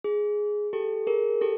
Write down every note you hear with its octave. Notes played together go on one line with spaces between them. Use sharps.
G#4
G4 A4
G#4 A#4
G4 A4